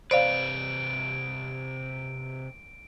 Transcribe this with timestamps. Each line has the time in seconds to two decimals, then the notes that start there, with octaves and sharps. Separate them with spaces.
0.11 C3 B4 C5 D5 F5 D7